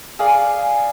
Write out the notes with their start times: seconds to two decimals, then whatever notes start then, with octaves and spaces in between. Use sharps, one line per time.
0.19 G#4 D5 F5